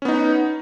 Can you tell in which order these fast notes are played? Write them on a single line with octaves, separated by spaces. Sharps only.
C#4 B3 D#4